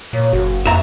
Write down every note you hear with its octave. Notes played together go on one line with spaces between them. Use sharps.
A#2 C#5
F#1 F#4
F2 E5 A#5